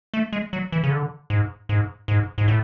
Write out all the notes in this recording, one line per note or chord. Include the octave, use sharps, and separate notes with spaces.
A3
G#3
F#3
E3
C#3
D3
G#2
G#2
G#2
G#2
A2